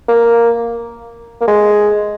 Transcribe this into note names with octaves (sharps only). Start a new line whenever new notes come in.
A#3
A#3
G#3